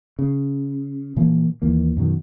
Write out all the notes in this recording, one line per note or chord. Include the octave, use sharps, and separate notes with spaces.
C#3
A#2 E3 F3 A#3
D#2 E3 A#3
F#2 B2 D#3 F#3